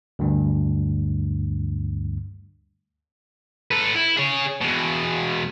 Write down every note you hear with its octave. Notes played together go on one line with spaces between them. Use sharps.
D2 G2
A4 B4
E4
G#4 C#5
E2 B2